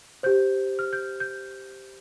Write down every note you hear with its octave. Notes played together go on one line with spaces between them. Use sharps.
G4 C5 G6
F6
G6
G6